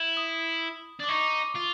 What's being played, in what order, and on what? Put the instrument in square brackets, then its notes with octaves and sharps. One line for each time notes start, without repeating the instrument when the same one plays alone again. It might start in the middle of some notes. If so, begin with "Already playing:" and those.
Already playing: [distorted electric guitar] E4
[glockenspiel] D#6
[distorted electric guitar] D4 [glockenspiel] D6
[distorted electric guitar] D#4 [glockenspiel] C#6
[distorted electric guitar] F4